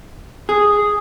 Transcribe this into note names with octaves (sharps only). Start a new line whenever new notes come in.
G#4